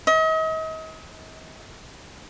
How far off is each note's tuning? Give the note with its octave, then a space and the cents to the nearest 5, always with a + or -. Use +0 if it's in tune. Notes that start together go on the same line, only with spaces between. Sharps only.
D#5 +40